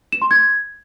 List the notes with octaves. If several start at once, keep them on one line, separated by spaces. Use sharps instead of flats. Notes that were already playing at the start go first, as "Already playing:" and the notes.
E7
C6
G#6